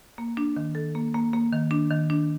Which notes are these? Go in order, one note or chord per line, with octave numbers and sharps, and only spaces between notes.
A#3
D4
D#3
A4
A#3
A#3
A#3
D#3
D4
D#3
D4